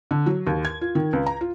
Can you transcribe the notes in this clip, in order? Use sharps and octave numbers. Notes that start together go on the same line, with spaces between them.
D3
F#3
D#2
G#6
F4
D#3
C#2
A#5
F4